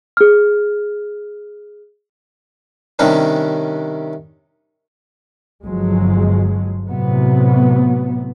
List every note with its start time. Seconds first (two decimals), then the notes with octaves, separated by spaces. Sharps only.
0.17 G#4 F6
2.99 C3 D#3 G3 C#4 D4
5.65 G1 F3 F#3 G#3
6.90 A2 C3 F#3 B3